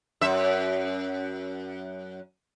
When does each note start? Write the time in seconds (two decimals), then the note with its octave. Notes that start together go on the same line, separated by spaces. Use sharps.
0.21 F#2 E5